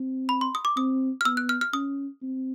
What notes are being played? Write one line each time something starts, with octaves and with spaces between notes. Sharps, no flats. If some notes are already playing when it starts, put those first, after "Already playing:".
Already playing: C4
B5
C6
D#6
D6
C4 D#6
F6
B3 E6
F#6
F6
F6
C#4 D#6
C4